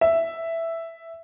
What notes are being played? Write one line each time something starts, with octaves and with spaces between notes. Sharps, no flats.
E5